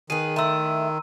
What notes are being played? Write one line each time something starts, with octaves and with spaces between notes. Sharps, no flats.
D#3 G#4 B4 D#7
A3 E4 A#5 C6 E6